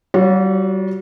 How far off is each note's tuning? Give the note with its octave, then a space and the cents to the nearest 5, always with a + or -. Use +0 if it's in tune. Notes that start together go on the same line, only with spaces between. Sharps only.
G3 -35 F#4 -40 C#5 +0